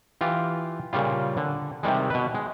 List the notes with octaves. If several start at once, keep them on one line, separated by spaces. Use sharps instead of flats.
E3 F4 G4
A#2 C#3 G3 F4
D3
C3 D#3 G3 G#3
B2 B4
G#3